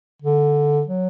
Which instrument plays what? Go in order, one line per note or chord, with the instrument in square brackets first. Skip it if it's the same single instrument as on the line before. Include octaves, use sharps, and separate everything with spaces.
[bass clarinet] D3
F#3